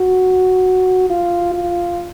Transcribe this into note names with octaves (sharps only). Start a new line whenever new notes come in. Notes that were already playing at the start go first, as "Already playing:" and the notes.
Already playing: F#4
F4
F4